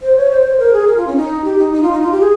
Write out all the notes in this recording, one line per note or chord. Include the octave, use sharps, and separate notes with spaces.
C5
C#5
C5
C#5
C5
A#4
G#4
A#4
F4
C#4
D#4
G4
D#4
D#4
F4
D#4
F4
G4
G#4